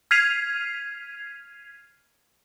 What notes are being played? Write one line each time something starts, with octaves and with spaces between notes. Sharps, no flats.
F6 G#6 B6 C7 D#7 F7